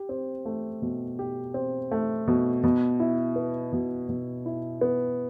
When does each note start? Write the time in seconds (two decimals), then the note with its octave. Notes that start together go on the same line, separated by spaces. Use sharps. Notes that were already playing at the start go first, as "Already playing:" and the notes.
Already playing: G4
0.09 C4
0.46 A3
0.82 B2
1.19 G4
1.54 C4
1.92 A3
2.28 B2
2.64 B2
3.00 E4
3.36 B3
3.73 B2
4.09 B2
4.46 E4
4.81 B3